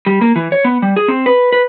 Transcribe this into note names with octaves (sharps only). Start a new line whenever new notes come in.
G3
A#3
E3
C#5
B3
G3
G#4
C4
B4
B4